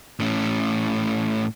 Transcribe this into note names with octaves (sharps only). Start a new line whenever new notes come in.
A2 C#4